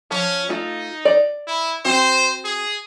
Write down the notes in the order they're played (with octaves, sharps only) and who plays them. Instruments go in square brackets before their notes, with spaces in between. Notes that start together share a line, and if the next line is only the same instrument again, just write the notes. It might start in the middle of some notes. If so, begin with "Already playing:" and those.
[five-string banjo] F3 [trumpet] C#4
[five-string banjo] A3 F4 [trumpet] D#4
[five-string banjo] D5
[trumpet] E4
[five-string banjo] C4 F#4 [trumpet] C5
[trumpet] G#4